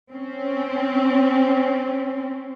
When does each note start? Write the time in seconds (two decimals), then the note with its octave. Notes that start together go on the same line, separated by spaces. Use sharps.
0.12 C4 C#4